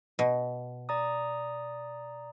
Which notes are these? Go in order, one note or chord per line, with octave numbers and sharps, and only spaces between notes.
B2
D5 A#5 D#6